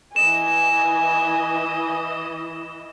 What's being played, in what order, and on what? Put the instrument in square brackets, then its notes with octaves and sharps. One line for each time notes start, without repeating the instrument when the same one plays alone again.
[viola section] E3 D#5 [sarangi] G#5 [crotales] E7